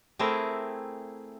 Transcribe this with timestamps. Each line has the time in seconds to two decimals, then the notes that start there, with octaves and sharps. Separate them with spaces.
0.19 A3 C4 E4 G#4 A#4